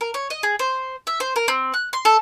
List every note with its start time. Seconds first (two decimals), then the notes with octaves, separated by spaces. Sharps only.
0.01 A#4
0.14 C#5
0.30 D#5
0.43 G#4
0.59 C5
1.07 E5
1.20 C5
1.36 A#4
1.48 C4
1.74 F#6
1.93 C6
2.05 A4